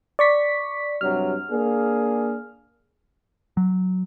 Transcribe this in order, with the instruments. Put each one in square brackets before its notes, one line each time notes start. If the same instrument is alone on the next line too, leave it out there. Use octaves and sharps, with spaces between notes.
[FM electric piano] D5 C#6 B6
[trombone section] G2 C3 F#3 [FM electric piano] F6
[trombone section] A#3 D4 G#4
[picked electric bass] F#3